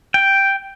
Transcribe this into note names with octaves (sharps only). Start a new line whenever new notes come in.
G5